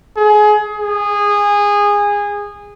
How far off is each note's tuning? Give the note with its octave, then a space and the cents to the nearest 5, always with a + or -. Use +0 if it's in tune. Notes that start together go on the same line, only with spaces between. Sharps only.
G#4 +25
G#4 -20